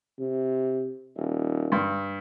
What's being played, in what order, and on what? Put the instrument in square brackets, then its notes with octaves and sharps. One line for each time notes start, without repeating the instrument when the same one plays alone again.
[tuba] C3
D#1
[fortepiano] G2